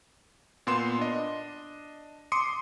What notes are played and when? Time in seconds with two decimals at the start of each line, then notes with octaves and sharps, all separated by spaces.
0.67 A#2 B3 C6 E7
0.99 D4 D#5
2.32 C6 D6 D#6 C#7